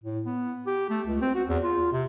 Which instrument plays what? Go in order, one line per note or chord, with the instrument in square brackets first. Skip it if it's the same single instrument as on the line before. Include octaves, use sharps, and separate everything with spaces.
[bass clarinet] A2
B3
G4
A3
C#2
C4
F#4
E2
F4
C3